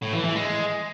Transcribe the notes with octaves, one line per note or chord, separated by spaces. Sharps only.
A2
E3
E3
G#3